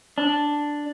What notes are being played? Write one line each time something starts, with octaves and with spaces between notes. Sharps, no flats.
D4